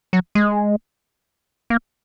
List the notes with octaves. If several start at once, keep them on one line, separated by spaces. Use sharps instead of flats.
F#3
G#3
A#3